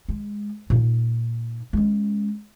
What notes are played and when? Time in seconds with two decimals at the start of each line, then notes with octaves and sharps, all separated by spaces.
0.09 G#3
0.70 A#2 D#4
1.73 G#3 C#4